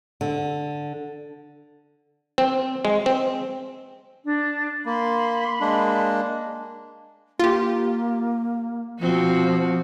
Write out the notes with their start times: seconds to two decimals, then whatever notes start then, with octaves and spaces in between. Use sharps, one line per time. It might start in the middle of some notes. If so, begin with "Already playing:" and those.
0.21 D3
2.38 C4
2.85 G#3
3.06 C4
4.25 D4
4.86 A#3 B5 C6
5.61 G#3 A#3 D4
7.40 A#3 F4 G4
9.00 B2 F3 C4 F#4